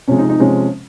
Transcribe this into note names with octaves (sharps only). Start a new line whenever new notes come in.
C3 F3 G#3 C#4
D#4
D#4
C3 F3 G#3 C#4